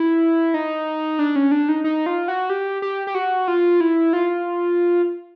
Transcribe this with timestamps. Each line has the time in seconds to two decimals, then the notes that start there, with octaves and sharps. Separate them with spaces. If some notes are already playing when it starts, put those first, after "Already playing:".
Already playing: E4
0.54 D#4
1.19 D4
1.36 C#4
1.51 D4
1.69 D#4
1.84 D#4
2.06 F4
2.28 F#4
2.50 G4
2.82 G4
3.07 G4
3.15 F#4
3.48 F4
3.81 E4
4.13 F4